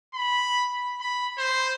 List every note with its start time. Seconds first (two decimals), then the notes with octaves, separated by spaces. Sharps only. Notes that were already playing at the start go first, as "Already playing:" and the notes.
0.14 B5
1.00 B5
1.38 C5